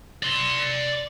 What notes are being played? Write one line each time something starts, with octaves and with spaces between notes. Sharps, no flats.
D5 C6